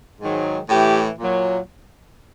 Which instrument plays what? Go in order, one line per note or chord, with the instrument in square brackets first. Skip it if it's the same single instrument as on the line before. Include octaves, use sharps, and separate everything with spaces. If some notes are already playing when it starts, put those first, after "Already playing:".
[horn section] G#2 D#3 F#3
A2 E3 G4
A#2 F#3